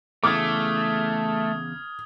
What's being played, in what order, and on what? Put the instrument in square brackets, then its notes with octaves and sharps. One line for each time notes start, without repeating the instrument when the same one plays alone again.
[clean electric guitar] E2 C#3 [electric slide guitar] A3 [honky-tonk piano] D6 [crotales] D#6 F6 G#6